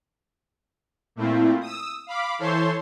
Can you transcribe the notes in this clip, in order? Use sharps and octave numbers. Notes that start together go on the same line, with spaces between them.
A#2 A3 C4 E4 F4
D#6 E6
F5 B5 D6
E3 A4 C5 C#5 C6